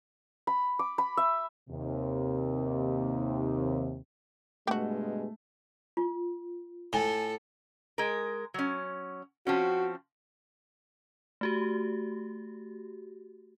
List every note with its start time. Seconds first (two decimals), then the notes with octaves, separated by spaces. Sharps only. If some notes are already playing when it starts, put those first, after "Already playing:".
0.47 B5
0.79 D6
0.98 B5
1.17 E5
1.69 D#2 C3
4.67 G2 B2 G#3 A3 F#4 G4
5.97 F4
6.93 A2 A4 G#5 G7
7.98 G#3 A#4
8.54 F#3 C#4
9.47 F3 C4 C#4 F#4
11.41 A3 F#4 G4